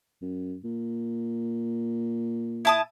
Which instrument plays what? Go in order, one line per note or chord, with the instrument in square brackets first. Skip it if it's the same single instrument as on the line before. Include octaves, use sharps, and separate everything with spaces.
[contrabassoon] F#2
A#2
[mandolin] E4 A5 D#6